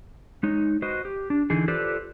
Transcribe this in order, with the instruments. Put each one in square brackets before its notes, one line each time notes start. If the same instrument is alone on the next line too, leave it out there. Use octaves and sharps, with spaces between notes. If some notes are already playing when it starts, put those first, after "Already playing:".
[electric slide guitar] G#3 D#4 C#5
F#4 B4 C5 D#5
G4
D4
D3 E3 D#4 G#4
F4 G4 A4 B4 C5 D5